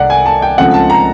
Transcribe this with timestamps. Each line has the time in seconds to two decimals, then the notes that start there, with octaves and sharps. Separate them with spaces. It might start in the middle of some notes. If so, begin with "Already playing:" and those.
Already playing: C2 C3 D5 F#5
0.10 G#5
0.26 A5
0.42 G5
0.58 C#2 C#3 F3 A3 C4 F#5
0.74 A5
0.90 A#5